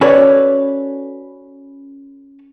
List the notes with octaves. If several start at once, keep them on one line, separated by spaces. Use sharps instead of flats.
C#4 F#4 A4 B4 C#5 D5